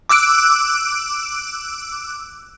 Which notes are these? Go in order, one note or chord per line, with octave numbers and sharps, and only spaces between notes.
D6 E6 F#6 D7